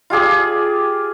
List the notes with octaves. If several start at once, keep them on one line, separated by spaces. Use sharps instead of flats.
F4 G4 G#4 D5